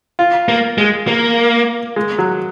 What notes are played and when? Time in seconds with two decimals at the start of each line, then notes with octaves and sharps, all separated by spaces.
0.19 F4
0.48 A#3
0.78 G#3
1.08 A#3
1.96 G#3
2.19 F#3